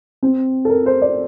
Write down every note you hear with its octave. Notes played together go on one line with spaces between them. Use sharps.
C4
A4
A#4
C5
D5